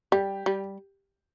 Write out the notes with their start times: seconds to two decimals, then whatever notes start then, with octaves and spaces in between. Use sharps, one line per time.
0.12 G3 G4
0.46 G3